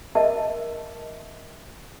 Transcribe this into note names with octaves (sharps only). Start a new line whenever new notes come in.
A#4 D#5 E5 A5